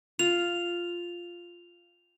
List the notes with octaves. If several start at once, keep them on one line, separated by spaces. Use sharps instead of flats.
F4 F7